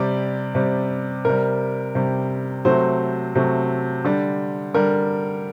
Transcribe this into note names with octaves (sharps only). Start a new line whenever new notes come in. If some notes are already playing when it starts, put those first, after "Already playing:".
Already playing: C3 G3 D5
C3 G3
C3 G3 A#4
C3 G3
C3 F#3 A3 C5
C3 F#3 A3
D3 G3
D3 G3 A#4